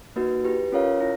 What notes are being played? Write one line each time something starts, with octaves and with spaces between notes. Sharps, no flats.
A#3 D#4 F#4 B4
E4 G4 B4
C#4 F4 A#4 C#5 F5
E4